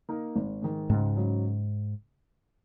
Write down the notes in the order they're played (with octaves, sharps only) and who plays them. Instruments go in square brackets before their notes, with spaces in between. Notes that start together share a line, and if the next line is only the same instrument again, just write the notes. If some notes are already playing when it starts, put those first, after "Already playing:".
[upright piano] A#3 D#4 A#4
G#1
G#2 D#3
[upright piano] C#2 [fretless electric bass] G#2
[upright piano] C#3 F#3